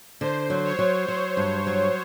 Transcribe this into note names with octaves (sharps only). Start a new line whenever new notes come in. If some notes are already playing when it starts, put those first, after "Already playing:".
D3 C5
F#3
C#5
F#3
F#3 C5
G2
F#3